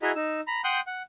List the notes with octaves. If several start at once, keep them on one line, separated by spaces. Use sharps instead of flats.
E4 F#4 G#4 D#5 E5 A#5
D#4 E6
A#5 B5
F#5 G5 C6 D#6 F#6 G6
F#5